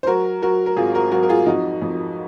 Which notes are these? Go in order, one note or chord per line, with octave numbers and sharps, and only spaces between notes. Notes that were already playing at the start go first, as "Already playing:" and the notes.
C5
F#3 F#4 A#4
F#3 F#4 A#4
A#4
G#1 F4 G#4
F#4 A#4
F#3 F#4 A#4
A#4
F4 G#4
F2 D#4 F#4
F2